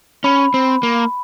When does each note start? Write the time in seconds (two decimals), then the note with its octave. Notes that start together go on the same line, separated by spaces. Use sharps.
0.24 C#4 B5
0.54 C4
0.83 A#3